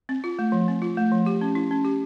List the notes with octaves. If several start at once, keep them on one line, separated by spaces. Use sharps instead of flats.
C4
F4
A3
F3
C4
F4
A3
F3
G4
C#4
E4
C#4
G4